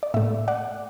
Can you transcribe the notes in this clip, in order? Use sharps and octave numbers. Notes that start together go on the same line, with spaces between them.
D5
A2 A3 E5
D5 F#5